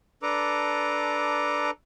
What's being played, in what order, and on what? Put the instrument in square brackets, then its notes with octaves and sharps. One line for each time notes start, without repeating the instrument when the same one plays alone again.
[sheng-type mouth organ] D4 A4 B4 A#5 D6